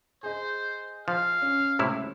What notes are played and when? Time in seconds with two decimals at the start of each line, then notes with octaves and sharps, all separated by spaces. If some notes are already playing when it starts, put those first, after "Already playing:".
0.23 G#4 C5 D#5
1.08 F3 F5
1.42 C#4
1.79 C#2 A2 C3 E4